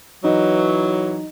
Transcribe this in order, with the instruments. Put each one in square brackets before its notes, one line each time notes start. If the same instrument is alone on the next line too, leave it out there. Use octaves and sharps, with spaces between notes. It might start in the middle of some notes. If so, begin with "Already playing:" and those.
[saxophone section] E3 F#3 [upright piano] D#4